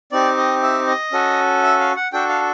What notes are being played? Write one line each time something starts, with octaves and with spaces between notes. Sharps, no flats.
C4 D#4 G4 D5
D#5
E5
D#5
C#4 F#4 A4
E5
F5
F#5
D4 F#4 A4 G5
F5